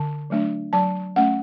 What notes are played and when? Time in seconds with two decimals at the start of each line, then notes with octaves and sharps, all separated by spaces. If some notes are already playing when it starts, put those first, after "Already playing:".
Already playing: D3 A5
0.30 F#3 A3 D4
0.73 F#3 A5
1.16 A3 C#4 F#5